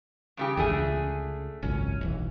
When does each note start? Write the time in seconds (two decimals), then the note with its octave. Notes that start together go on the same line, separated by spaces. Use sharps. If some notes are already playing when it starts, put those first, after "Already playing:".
0.37 G2 C#3 G4
0.57 G#1 E2 D3 A3 G#4
0.70 C#2
1.63 G#1 C#2 F#2 C#4
2.01 E1 B1 E3